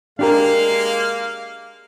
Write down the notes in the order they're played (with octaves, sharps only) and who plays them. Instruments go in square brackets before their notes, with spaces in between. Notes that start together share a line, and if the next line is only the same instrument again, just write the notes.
[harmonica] G#3 A#3 F5 [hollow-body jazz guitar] D4 G4 A#4